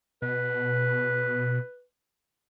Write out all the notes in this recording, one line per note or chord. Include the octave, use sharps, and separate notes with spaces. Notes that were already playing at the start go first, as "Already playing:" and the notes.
B2 B4